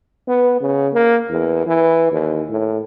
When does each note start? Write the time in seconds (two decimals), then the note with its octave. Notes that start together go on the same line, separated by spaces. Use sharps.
0.28 B3
0.61 C#3
0.94 A#3
1.31 E2
1.67 E3
2.11 D#2
2.49 A2